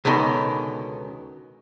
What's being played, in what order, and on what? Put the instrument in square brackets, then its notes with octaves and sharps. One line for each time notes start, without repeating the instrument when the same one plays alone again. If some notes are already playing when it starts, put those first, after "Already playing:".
[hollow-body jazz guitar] C#2 B2 D3 D#3 C#4